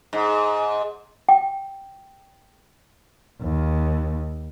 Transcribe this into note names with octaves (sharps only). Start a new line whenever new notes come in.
G#2
G5
D#2